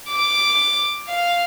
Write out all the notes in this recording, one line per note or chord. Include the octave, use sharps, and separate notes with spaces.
D6
F5